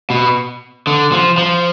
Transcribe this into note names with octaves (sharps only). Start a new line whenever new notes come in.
B2
D3
F3
F3